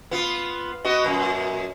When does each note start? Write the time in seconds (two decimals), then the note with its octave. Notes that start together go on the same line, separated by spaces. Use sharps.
0.11 B3 F4
0.85 B3 F#4 D#5
1.04 F#2 A#2